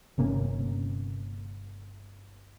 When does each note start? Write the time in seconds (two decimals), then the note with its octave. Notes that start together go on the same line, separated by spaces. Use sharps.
0.18 G1 C3 A#3 C#4